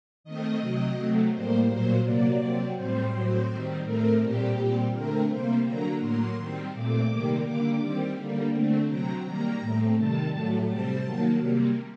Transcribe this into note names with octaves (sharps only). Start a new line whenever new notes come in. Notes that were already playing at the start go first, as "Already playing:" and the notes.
D#3 A3 C4 D#5
C3 F#3 C4
C3 F#3 A3 C4
A2 G3 A#3 C5
A#2 F#3 A#3 C5
C3 F#3 A#3 D5
C3 F#3 C4
A2 G3 C4 C5
A2 F#3 C4
D#3 G3 C4
A2 A3 C4 A#4
A#2 G3 C4 G4
A#2 G3 C4
D3 A3 C4 A#4
C3 G3 A#3 C5
D3 F#3 A#3 A#5
A2 F#3 A#3 C6
D#3 G3 C4
A#2 A3 C4 D6
C3 D#3 G3 A#3
D3 G3 A#3 D6
D#3 G3 C4
D3 G3 A#3
D3 A3 C4
C3 F#3 C4 A#5
D#3 G3 A#3 A#5
A2 A3 C4
C3 D#3 G3 A5
A2 F#3 A3
C3 G3 C4 A5
D#3 F#3 A#3
C3 G3 A#3